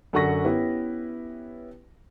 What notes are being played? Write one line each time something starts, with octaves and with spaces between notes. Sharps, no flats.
F#2 D3 F#5 C#6 A#6 B6
B3 C#4 E4 G4 B4